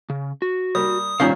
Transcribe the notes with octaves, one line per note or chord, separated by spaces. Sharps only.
C#3
F#4
G3 A#3 D#6
G#1 A#2 G3 C#4 D#4 C5 F5